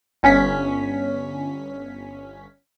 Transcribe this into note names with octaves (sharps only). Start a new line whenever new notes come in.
G1 C#4 B6